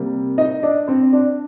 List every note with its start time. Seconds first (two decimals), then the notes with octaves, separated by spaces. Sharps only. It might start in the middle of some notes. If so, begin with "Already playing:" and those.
Already playing: C3 G3 A#3
0.38 D#4 D#5
0.63 D4 D5
0.87 C4 C5
1.13 D4 D5